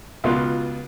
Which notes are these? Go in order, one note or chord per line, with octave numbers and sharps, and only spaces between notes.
C#2 B2 F4